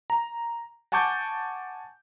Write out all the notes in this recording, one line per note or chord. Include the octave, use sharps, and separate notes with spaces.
A#5
F#5 G#5 A5 C#6 D6 G6